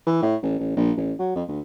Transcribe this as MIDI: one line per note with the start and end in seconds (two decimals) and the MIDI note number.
0.06 0.18 52
0.22 0.36 45
0.42 0.55 33
0.59 0.74 33
0.76 0.92 34
0.97 1.13 33
1.19 1.34 54
1.35 1.43 41
1.48 1.60 38